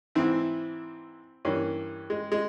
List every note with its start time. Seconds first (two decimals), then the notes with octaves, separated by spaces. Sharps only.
0.15 G#2 E3 C4 E4
1.45 G2 E3 A#3 C#4
2.10 G#3
2.32 G#3